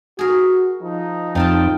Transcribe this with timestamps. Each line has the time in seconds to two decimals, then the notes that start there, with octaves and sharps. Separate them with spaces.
0.19 F#4 G#4 A#4
0.82 F3 D#4
1.35 F2 D#4 F4 G5 A5